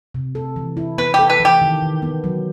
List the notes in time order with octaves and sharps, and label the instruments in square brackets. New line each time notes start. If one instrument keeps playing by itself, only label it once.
[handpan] C3
A4
E3
E4
[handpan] B3 [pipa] B4
[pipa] G4 [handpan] A4
[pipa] B4
[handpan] E3 [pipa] G4
[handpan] D#3
D#3
B3
F#3